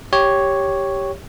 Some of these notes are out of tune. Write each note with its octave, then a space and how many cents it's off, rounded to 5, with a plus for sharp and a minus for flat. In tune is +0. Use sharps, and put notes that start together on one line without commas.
G4 +0 C#5 +0